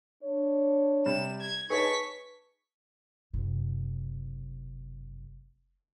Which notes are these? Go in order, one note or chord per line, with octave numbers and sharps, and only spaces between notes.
D4 C#5
C3 G3 E7
G#6
D#4 G#4 B4 C#5 A5 C#6 B6
F#1 C3